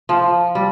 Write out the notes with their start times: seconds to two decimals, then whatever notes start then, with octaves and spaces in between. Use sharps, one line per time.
0.09 F3
0.55 G3